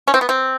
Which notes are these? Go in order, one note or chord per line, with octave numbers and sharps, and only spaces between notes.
C#4
C4
B3
C4